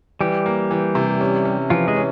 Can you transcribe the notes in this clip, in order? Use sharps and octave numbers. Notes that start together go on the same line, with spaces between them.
E3 G3 G4
A#3
E3
C3
C#4
C#4
E3 F3 F4
G#3 G#4
C#4